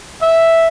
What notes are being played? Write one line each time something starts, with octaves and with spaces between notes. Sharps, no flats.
E5